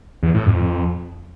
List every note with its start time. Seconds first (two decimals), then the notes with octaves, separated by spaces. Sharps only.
0.23 E2
0.35 A2
0.46 F2